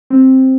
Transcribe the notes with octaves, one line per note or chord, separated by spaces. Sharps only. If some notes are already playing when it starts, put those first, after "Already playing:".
C4